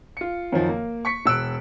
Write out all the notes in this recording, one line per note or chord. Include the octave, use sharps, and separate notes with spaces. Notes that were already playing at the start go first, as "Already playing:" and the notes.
F4 C#7
F#2 D#3 F3
A#3
C#6 B6 C#7
E1 E6 F#6 D7